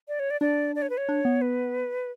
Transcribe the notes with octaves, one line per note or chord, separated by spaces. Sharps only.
D5
C#5
D5
D4 D5
D5
C#5
B4
C#5
D4
B3
B4